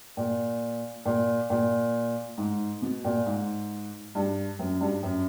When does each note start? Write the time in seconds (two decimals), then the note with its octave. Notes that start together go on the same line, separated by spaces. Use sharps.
0.17 A#2
1.05 A#2
1.50 A#2
2.38 G#2
2.82 B2
3.04 A#2
3.26 G#2
4.15 G2
4.59 F#2
4.81 G2
5.03 F#2